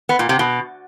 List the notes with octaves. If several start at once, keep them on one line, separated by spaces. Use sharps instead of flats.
B3
A#2
C3
B2